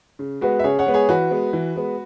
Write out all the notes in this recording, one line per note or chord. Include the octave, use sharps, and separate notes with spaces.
C#3
G#3 B3 F#4 B4
E5
C#3 G#4 C#5
C#5 F#5
G#3 B3
G#4 C#5
E3 F#4 B4
G#3 B3
E3
G#3 B3